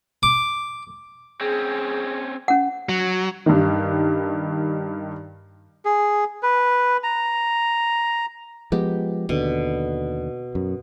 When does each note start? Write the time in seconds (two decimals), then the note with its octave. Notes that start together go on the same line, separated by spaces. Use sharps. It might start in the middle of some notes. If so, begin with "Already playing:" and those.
0.23 D6
1.41 C4 C#4 G#4
2.48 C#4 F#5
2.89 F#3
3.46 G2 D#3
5.85 G#4
6.43 B4
7.04 A#5
8.72 F3 G#3 B3 G4
9.29 D#2 B2 D3
10.55 F#2